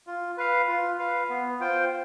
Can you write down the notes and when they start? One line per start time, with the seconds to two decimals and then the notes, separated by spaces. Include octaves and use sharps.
0.07 F4
0.37 B4 F5
0.68 F4
0.99 B4 F5
1.30 B3
1.60 F4 C5 G5